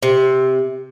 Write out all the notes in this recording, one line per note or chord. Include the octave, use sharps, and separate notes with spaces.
C3